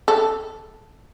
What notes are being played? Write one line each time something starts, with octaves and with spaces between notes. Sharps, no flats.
A4